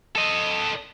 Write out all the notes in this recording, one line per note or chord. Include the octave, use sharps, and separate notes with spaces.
A4 D#5